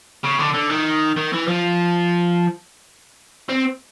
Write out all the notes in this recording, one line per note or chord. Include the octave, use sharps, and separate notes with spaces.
C#3
D3
D3
D#3
D#3
E3
F3
C4